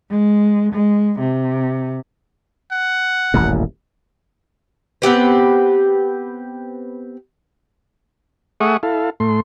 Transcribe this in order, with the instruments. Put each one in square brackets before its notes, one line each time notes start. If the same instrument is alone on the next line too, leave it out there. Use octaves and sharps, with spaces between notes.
[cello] G#3
G#3
C3
[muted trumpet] F#5
[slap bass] D#1 A1 F#2
[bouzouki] B3 C4 G4 B4
[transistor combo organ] A3 G#4 E5 F#5 C#6 D#6
E4 A4 F5
A2 A3 C6